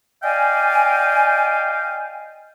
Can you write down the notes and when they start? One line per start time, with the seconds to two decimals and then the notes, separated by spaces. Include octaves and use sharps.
0.23 D5 D#5 F5 G5 G#5